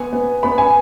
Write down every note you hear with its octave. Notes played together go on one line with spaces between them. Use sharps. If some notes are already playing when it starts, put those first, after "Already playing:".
Already playing: B3 G#5
B3
B3 B5
G#5